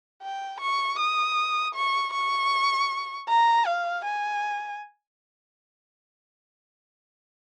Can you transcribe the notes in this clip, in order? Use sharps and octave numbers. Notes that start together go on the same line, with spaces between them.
G5
C#6
D#6
C#6
C#6
A#5
F5
G#5